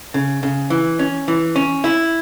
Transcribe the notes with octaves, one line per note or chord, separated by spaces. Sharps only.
C#3
C#3
E3
C#4
E3
C#4
E4